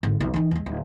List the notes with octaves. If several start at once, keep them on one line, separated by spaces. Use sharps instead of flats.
G#1 D3
B1 F2
E3 D#4
D#2 G#3
D1